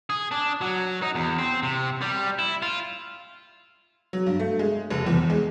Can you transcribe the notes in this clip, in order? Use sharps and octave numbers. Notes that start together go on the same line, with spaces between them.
G#4
D4
F#3
D#4
E2
C4
C3
G3
E4
F4
F#3
G2
A3
G#3
F1
E2
G#3